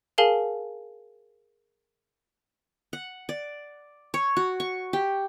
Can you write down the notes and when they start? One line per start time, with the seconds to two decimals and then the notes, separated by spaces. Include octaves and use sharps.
0.18 G#4 A#4 F5 G#5 A5
2.93 F#5
3.29 D5
4.14 C#5
4.37 F#4
4.60 C#6
4.93 G4